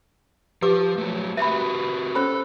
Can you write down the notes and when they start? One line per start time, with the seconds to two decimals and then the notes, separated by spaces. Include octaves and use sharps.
0.62 F3 G4 B4 D6
0.98 F#3 A3
1.37 F#4 G4 B4 E5 B5
2.15 C#4 A4 C5 B5